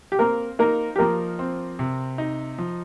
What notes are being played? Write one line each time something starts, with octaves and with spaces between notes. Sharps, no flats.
G4
A#3 C4 A#4
A#3 D#4 A#4
G4
F3 A#3 A#4
C4
C3
D#4
F3